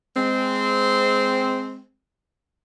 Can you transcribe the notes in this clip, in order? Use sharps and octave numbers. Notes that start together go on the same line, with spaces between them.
G#3 C4